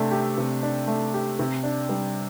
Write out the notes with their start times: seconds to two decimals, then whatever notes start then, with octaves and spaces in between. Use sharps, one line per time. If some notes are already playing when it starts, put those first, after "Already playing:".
Already playing: C3 A3 D4
0.11 G4
0.38 C3
0.63 D4
0.87 A3
1.14 G4
1.39 C3
1.64 D4
1.89 G3